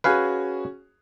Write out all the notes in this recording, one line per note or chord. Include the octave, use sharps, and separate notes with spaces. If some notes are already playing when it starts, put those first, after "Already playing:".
C#4 F#4 G#4 B4 F5 G#5